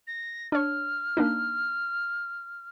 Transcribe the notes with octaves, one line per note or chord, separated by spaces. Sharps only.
A#6
D4 C#5 F6
A#3 D4 D#4